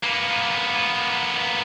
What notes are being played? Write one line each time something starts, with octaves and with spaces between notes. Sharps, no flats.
A#3 B3